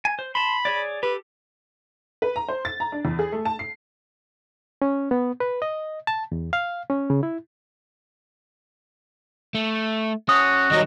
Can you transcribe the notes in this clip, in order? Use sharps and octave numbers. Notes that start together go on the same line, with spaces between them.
G#5
C5
A5 B5 C6
G#4 C#5 D5
G4 A4 B4
B4
A#5
C5
A6
A#5
D4
E2
G#4
A3
A5
C7
C#4
B3
B4
D#5
A5
E2
F5
C#4
C#3
E4
A3
C#4 F#4 D#6
D#3 F#3 G3 D#5